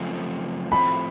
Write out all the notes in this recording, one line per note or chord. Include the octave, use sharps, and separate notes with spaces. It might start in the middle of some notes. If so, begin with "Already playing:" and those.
Already playing: F#2 C#3 F3 A3 C4
A2 F3 A3 C4 B5